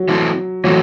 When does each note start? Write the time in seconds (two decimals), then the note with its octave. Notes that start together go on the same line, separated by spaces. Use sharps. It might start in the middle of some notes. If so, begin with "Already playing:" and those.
Already playing: F#3
0.08 E3 A3 C4 E4
0.64 E3 F#3 A3 C4